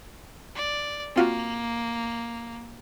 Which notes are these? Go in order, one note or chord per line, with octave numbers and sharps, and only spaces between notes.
D5
A#3 C4 F4 F#4